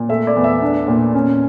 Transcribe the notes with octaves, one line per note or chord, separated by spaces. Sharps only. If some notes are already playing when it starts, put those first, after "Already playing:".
Already playing: A#2
A3 E5
D5
E2
E5
D4
A#2
C#4